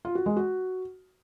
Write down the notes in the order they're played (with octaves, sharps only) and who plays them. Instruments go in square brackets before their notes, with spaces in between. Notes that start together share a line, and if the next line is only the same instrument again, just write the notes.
[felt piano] F4
F#4
G#3
F#4